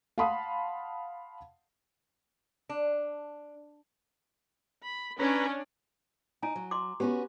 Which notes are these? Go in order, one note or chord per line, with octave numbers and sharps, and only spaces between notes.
F5 F#5 A5 B5 C6 D#6
D4
B5
C#4 D4 B4 A#5
D#4 G#5 A#5
F#3
C6 D6
B3 C#4 F#4 G4